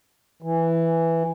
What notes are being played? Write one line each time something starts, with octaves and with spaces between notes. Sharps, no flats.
E3